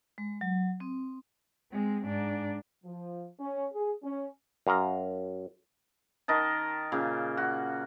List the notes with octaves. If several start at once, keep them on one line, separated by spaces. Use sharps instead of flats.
G#3
F#3
C4
G#3 C4
G#2 D4
F3
C#4
G#4
C#4
F#2 F5 A#5
D#3 A#4 D#5 A5
A#2 C#3
F#4